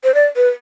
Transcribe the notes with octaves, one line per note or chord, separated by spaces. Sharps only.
C5
D5
B4